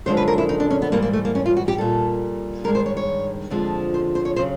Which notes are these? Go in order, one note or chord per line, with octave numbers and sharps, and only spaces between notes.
F#2 D3 F3 G#3 C5
B4
A#4
E4
D#4
D4
C#4
B3
G#2 E3 G3 A#3
A#3
A3
A#3
C#4
F4
F#4
G4
A#2 G3 A4
G2 D#3 G#3 A#4
C5
C#5
C#5
F2 D3 F3 G#3
C5
C5
C#5
C#3 F#3 C5